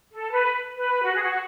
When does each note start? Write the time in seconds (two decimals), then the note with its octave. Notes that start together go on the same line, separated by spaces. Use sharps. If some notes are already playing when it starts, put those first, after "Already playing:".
0.12 A4
0.30 B4
0.76 B4
1.04 F#4
1.15 G#4
1.22 F#4